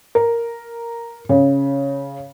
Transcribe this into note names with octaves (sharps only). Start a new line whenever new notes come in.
A#4
C#3